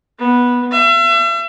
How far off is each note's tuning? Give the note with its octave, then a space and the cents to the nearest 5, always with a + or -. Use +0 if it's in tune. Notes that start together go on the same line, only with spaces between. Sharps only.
B3 -10
E5 +40